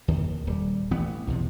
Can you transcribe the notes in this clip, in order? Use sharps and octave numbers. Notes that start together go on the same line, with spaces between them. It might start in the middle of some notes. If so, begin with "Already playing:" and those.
D#2 D#3
D#1 G3
A1 E3 B3
B1 E2 C3